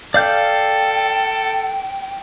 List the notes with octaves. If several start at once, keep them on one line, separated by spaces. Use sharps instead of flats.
A4 D5 F5 G5 G6